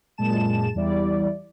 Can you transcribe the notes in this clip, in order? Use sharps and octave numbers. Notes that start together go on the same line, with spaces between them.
F#2 A#2 G#3 A5 E7
E2 G3 E4 D5